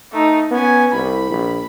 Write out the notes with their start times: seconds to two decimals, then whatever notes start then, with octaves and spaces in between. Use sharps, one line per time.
0.12 A3 D#4
0.51 B3 C#4 G#5
0.93 C2 B5
1.30 A#1